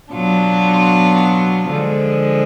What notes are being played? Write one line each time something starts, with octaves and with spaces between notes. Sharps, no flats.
B2 F#3 B3 D4 F4
D3 F3 G#3